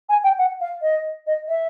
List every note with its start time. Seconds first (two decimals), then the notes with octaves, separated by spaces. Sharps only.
0.09 G#5
0.24 G5
0.38 F#5
0.61 F5
0.82 D#5
1.27 D#5
1.48 E5